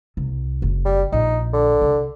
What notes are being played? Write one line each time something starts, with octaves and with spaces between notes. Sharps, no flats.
C2
F#1
G3
A#1 D#4
D3
C2